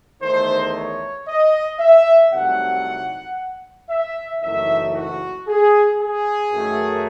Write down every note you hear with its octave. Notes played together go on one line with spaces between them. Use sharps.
E2 D#3 A3 D#4 C5
C#5
D#5
E5
C2 C3 F#3 A3 D#4 F#5
E5
F#1 F#2 E3 A3 D#4 E5
F#4
G#4
G#4
F#2 D#3 A3